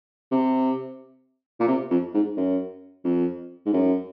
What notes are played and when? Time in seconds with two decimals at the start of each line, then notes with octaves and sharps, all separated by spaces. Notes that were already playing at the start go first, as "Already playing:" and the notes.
0.31 C3
1.60 A#2
1.68 C3
1.91 F2
2.15 G#2
2.37 F#2
3.05 F2
3.66 G#2
3.73 F#2